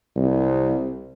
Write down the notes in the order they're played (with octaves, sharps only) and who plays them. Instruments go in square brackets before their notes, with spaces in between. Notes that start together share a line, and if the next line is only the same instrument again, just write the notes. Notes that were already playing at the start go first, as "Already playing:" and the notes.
[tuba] C2